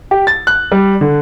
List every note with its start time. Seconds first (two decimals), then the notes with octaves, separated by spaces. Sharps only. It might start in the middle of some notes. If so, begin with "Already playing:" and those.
0.11 G4
0.27 A6
0.47 F#6
0.72 G3
1.01 D3